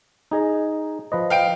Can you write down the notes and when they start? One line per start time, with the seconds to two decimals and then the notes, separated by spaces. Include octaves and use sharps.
0.31 D#4 G#4 D#5
1.12 F3 B4 D#5
1.30 F5 G5 D7